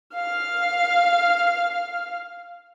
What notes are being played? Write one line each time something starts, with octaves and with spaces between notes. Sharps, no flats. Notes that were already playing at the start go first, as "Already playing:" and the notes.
F5 F6